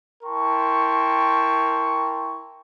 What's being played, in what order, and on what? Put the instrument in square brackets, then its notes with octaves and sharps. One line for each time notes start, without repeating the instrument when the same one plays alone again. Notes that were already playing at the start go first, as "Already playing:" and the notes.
[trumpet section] E4 A#4 G5 A5 C6 C#6